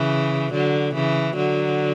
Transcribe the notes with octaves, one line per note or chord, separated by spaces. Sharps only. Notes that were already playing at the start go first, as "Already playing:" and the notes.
Already playing: C#3 E3
D3 F#3
C#3 E3
D3 F#3